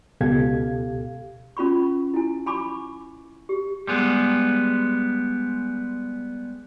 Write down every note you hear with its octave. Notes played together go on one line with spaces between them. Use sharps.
C#2 B2 G4 A4 F5 G#6
C#4 F4 B5 C#6
E4 G#5
G#5 B5 C#6 D6
G4
G3 G#3 B3